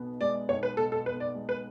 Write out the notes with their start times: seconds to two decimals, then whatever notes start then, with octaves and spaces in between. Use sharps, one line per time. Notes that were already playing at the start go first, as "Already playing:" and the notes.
Already playing: B1 B2 B3
0.21 G#3 D5
0.49 B1 C#5
0.63 B4
0.77 B2 A4
0.92 A4
1.06 B3 B4
1.20 D5
1.35 G#3
1.49 B4